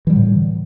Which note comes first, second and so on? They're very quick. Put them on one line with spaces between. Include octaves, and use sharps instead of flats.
E3 G3 D3 A2